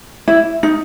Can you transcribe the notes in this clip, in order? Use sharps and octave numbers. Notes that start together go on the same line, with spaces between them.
E4
D#4